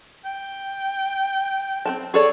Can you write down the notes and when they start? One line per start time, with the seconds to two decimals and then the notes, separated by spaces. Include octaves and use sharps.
0.25 G5
1.86 C4 F#4 A5
2.14 G#4 A4 C#5 D5